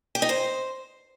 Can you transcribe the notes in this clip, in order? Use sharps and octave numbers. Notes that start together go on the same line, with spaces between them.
G4
D#4
C5